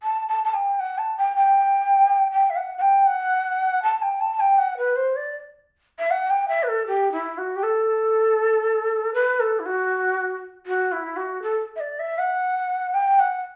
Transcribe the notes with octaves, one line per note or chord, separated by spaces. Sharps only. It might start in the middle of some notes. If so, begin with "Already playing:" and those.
A5
A5
A5
G5
F#5
A5
G5
G5
G5
E5
F#5
F#5
G5
F#5
A5
G5
A5
G5
F#5
B4
C5
D5
E5
F#5
G5
E5
B4
A4
G4
E4
F#4
G4
A4
B4
A4
E4
F#4
F#4
E4
F#4
A4
E5
D5
E5
F#5
G5
F#5